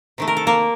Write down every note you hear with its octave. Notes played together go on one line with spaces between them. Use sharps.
C3 D#3 A3
A#4
A4
A#3 A#4